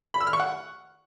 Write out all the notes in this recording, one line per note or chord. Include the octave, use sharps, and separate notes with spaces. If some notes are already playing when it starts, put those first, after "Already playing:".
B5
E6
F6
C#6
F#5